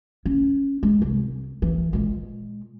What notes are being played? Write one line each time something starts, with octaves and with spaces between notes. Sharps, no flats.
C#4
G#3
C2
E3
A#2 G#3